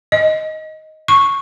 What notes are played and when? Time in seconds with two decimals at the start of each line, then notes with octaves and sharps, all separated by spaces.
0.12 D#5
1.08 C#6